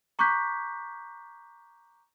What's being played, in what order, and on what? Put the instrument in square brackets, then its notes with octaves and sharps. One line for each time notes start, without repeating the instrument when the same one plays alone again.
[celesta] A#5 C#6 D6 F#6 G6 B6